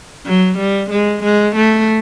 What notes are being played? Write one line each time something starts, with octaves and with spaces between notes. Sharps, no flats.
F#3
G3
G#3
G#3
A3